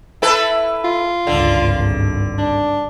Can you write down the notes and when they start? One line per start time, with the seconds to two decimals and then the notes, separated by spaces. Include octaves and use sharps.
0.22 E4 A4 B4
0.84 F4
1.27 G#1 C#2 G2 D3
2.38 D4